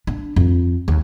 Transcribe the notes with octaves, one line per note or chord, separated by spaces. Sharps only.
D4
F2
D#2